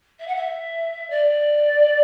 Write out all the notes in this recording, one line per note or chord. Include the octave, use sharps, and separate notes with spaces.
E5
F#5
E5
D5